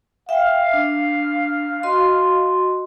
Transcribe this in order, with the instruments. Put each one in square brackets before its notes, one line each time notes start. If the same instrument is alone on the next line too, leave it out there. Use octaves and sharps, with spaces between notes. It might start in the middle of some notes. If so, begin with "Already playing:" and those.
[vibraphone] E5 G5 [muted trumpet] F5
[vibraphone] D4
F#4 D#5 C6